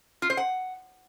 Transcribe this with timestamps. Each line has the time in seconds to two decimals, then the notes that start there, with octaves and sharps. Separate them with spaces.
0.22 F4
0.30 C5
0.37 F#5